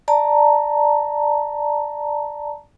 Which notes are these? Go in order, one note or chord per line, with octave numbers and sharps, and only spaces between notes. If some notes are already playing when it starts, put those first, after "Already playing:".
D5 A5 A#5